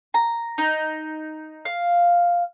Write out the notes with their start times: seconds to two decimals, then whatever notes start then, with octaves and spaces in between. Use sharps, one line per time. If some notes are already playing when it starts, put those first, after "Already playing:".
0.14 A#5
0.58 D#4
1.65 F5